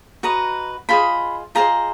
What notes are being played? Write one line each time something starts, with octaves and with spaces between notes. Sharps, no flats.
F#4 B4 D#5 A#5
F4 G#4 C5 D#5 B5
F4 G#4 C5 D#5 A#5